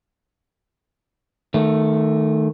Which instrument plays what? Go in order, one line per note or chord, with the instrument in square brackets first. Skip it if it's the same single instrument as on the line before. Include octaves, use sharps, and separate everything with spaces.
[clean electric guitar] D#3 A3